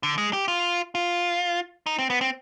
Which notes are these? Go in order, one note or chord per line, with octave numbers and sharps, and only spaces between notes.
D3
G#3
G4
F4
F4
D#4
C4
B3
C4